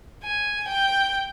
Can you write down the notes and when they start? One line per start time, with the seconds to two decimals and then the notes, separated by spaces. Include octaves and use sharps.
0.24 G#5
0.68 G5